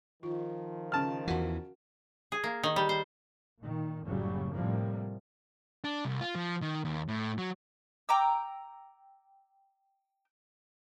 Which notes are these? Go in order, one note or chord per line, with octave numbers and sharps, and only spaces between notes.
D#3 F3 F4
C#3 A5 F6
E2 E3 F#4 A#4 F#5
G#4
A#3
D#3
G3
C5
A#2 D#3
F#1 A2 C#3 F#3 G3
A2 C3 F3 G3 A#3
D4
C2
F4
F3
D#3
D#2
A2
F#3
G5 A#5 D6 E6